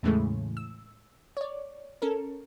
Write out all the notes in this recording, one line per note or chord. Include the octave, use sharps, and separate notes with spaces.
E2 A2 C#3 E3 G#3 A3
E6
C#5 D5
C#4 A4 A#4